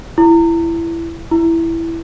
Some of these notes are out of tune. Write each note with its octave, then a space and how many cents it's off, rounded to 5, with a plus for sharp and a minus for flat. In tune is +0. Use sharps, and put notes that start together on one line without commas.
E4 +15
E4 +5